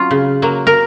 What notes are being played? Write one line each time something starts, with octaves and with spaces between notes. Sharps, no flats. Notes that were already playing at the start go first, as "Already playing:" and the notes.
Already playing: F#3 C#4 F4
C#3
F#3 A#3
A#4